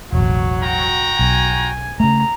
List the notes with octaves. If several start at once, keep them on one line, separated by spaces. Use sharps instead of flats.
E1 A1 F#3
F#4 G5 A#5
B1 G#5
C#3 A3 A#5